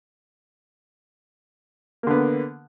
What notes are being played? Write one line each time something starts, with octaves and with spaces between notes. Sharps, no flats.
D3 A#3 B3